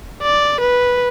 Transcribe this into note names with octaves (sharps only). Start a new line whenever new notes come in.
D5
B4